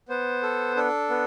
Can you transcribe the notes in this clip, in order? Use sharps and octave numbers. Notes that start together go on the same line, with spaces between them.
B3 C5
A4
D4 A4
B3